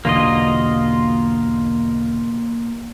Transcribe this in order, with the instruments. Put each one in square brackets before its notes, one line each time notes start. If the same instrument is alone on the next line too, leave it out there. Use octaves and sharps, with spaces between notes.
[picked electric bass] B1 E2 D3 [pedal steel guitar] A#3 F4 D#5